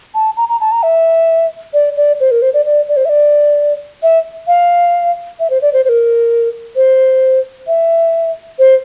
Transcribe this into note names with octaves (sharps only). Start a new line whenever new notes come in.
A5
A#5
A#5
A5
A#5
E5
D5
D5
C5
A#4
C5
D5
D5
D5
C5
E5
D5
E5
F5
E5
C5
D5
C5
C5
A#4
C5
E5
C5